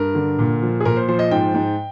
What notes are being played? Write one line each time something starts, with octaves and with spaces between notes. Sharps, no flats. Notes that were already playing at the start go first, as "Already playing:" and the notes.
Already playing: G2 A#4
D3
A#2
F3
G#4
A#2 A#4
C5
F3 C5
D#5
G#2 G5
G#2